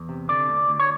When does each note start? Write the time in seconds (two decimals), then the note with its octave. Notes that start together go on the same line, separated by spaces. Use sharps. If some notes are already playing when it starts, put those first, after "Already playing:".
Already playing: E2
0.09 C3
0.29 D3 D5
0.49 D2
0.69 D2
0.80 C#5